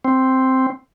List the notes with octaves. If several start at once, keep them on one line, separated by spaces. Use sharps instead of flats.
C4